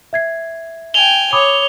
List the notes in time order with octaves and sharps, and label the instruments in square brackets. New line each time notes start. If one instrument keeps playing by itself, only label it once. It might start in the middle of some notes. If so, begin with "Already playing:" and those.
[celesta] E5 G#6 C7
[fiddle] G5 G#5 [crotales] F7 G7
[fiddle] C#5 [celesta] B5 D6 D#6